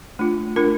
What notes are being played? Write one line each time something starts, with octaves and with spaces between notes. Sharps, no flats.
A3 D4 F4
A3 D4 F4 A#4